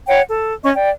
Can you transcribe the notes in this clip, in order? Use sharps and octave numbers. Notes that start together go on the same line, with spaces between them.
C#5 F#5 G5
A4
C#4 D#5 C#6
D5 G5